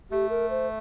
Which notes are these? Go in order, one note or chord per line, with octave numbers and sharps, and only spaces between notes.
A3 G4
A#4
C5